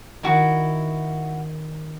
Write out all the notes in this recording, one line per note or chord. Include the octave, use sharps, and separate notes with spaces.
D#3 E4 F#4